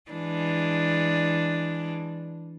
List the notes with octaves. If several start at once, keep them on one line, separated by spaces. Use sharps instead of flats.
E3 G#3 D4